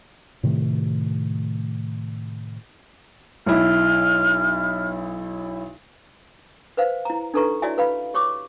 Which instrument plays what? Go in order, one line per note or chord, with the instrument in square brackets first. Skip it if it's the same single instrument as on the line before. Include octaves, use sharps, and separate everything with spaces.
[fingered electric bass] A2 C3 D#3 A3
[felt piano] B1 E4 [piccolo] F6
[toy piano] B4 C5 F5
E4 A#5
D4 D#4 A4 B4 A#5 C#6
E4 F#4 C#5 D5 E5 G#5
B4 F5 B5
G4 C#5 C#6 D6